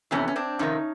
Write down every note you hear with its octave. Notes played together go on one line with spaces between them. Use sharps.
F2 C3 E3 B3 C#4
C#4
C4 D4
F2 C3 D#3 C#4 D#4